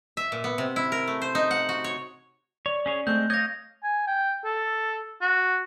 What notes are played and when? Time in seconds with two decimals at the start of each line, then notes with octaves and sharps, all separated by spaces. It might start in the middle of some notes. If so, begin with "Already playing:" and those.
0.17 E5
0.32 A#2
0.44 B3
0.58 C3
0.76 E4
0.92 A#4
1.07 A3
1.22 C5
1.35 D#4
1.51 F#5
1.69 F#4
1.84 C#5
2.66 C#5 D5
2.86 C#4 G#4 C#5
3.07 G#3 A3 C4 C#6 G6
3.30 C#5 D#5 F5 D6 G6 G#6 A#6
3.83 G#5
4.07 G5
4.45 A4
5.22 F#4